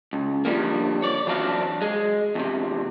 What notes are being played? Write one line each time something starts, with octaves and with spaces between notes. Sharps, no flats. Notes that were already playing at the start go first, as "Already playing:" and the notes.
C#2
D3 F3 G3 G#3 A#3
C#5 D5
E3 F#3 C4 D4 D5 F5
G#3
E2 C3